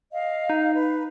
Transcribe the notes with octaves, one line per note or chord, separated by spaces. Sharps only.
D#5 F5
D#4
B4